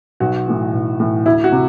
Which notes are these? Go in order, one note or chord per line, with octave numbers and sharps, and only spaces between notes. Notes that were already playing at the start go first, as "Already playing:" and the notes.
B1 F#4
A2 E3
B1
A2 E3
D2 E4
F#4
C3